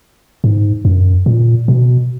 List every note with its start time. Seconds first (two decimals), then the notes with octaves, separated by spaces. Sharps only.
0.44 G#2
0.85 F#2
1.26 A#2
1.68 B2